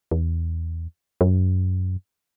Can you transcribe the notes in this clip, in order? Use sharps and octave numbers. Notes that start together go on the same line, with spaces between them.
E2
F#2